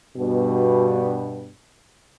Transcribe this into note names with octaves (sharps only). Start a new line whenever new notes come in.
G2 B2